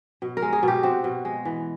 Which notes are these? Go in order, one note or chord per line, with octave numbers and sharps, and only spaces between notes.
B2
A#4
G#3
G#4
B2 G4
C4 F#4
B2
G#3
E3